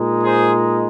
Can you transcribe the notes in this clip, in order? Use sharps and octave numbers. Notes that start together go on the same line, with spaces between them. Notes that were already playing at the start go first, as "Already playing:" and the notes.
Already playing: A#2 G#3 D#4
G#4 C5